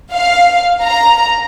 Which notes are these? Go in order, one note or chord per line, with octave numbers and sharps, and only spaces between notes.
F5
A#5